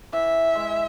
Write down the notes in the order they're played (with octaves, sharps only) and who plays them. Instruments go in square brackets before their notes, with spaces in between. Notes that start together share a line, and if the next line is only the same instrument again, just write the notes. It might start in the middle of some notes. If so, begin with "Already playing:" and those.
[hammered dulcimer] E3 [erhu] E5
[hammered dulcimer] G#3